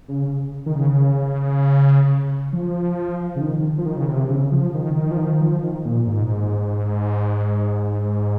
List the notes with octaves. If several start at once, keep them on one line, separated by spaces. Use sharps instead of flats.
C#3
D#3
C#3
F3
C#3
D#3
F3
D#3
C#3
C3
C#3
F3
D#3
D#3
F3
D#3
F3
D#3
A#2
G#2